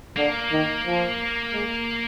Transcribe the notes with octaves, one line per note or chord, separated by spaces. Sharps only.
D3 A#3
D#3
F3
G#3